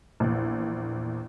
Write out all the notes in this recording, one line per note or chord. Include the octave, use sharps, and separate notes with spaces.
A#1 E2